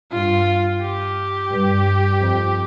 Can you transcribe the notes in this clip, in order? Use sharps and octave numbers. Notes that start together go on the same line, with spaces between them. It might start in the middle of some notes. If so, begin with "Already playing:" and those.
G2 F4
G4
G2
F2